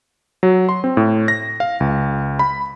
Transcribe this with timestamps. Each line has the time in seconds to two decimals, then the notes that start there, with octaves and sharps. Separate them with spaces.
0.43 F#3
0.69 C6
0.84 C4
0.97 A2
1.28 A#6
1.60 F5
1.80 C#2
2.39 B5